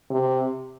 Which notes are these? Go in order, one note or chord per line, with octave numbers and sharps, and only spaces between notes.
C3